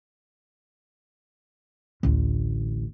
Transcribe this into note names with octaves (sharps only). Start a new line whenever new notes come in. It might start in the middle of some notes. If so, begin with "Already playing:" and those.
A1 D2